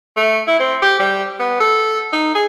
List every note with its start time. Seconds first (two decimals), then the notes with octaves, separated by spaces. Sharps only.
0.17 A3
0.47 E4
0.60 C4
0.82 G4
0.99 G3
1.40 B3
1.60 A4
2.13 D#4
2.35 G#4